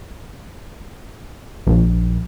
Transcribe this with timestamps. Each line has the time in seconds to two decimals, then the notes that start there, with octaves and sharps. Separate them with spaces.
1.67 A#1